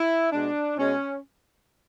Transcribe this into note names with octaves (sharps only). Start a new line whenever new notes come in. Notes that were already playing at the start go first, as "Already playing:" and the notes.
Already playing: E4
B2 G#3 D4
B2 G#3 C#4